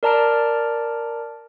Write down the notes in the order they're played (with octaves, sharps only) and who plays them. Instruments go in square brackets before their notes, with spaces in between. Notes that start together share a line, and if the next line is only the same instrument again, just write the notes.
[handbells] A#4 D5 A5 A#5 F6 D7